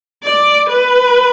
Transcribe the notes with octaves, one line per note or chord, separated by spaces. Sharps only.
D5
B4